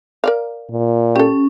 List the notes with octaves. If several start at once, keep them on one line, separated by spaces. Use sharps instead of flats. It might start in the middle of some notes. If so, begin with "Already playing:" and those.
A#4 D5 F5
A#2
C#4 G4 A4